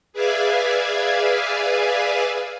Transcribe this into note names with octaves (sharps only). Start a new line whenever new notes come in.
G#4 B4 D5 E5 F5 G#5